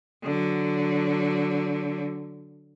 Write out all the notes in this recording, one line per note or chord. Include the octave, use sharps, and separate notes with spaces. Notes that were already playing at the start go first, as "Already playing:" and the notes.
D3 F#3